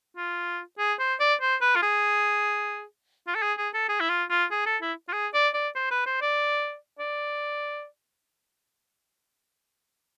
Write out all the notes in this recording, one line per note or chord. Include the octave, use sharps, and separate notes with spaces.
F4
G#4
C5
D5
C5
B4
F4
G#4
F4
A4
G#4
G#4
A4
G#4
E4
F4
F4
G#4
A4
E4
F4
G#4
D5
D5
C5
B4
C5
D5
D5